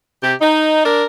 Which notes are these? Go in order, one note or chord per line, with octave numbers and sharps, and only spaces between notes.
C3 G4
D#4
D4 A#4